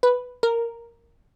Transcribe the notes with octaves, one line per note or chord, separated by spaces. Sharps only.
B4
A#4